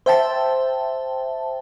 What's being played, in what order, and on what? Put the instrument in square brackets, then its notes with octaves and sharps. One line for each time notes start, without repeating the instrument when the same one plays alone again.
[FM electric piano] C5 E5 G5 A5